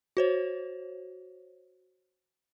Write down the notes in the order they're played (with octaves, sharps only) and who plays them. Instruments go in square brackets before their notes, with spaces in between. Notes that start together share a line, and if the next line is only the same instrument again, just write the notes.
[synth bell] F#4 C5 C#5